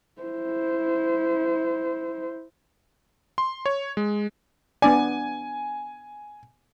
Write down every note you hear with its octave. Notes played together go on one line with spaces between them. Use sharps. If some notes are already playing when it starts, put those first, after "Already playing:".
E4 C5
C6
C#5
G#3
B3 D4 D5 G#5